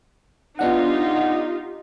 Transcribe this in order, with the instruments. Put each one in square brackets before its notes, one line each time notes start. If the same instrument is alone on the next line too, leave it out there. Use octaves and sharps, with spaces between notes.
[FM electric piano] B3 D4 F#5 [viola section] D#4 F4 G4